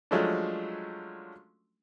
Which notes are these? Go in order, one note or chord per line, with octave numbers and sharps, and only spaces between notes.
F3 F#3 G#3 A3 C#4 D4